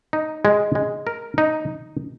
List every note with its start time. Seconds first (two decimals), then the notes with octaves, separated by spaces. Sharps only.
0.13 D#4
0.45 G#3
0.75 G#3
1.07 A#4
1.38 D#4